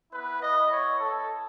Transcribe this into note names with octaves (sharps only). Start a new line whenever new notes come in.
B3 E4 B4
D#5
C#5
A4